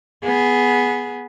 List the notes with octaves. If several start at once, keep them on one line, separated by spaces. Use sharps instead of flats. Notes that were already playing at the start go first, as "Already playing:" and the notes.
B3 G#4